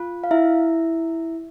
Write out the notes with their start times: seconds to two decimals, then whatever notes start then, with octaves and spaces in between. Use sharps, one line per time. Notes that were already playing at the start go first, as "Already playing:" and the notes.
Already playing: F4
0.24 F5
0.31 E4 E5